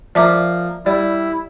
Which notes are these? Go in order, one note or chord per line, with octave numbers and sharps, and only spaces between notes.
F3 A#3 D5 E5 D6
G3 E4 D5